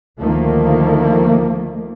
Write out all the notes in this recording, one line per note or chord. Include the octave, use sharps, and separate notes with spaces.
D2 D#3 F3 A3 A#3